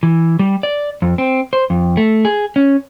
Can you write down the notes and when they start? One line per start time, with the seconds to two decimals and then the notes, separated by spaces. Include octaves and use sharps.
0.03 E3
0.39 G3
0.63 D5
1.02 F2
1.18 C4
1.53 C5
1.70 F2
1.97 A3
2.25 G#4
2.56 C#4